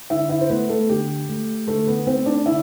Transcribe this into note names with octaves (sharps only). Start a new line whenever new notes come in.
D3 E4 E5
E4 E5
C5
A3 B3 B4
A3 A4
D3 G4
A3
D3 A3 A4
B3 B4
A3 C4 C5
D4 D5
D3 E4 E5